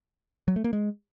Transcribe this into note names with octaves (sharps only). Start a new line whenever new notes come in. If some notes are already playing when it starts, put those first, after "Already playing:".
F#3
A3
A#3
G#3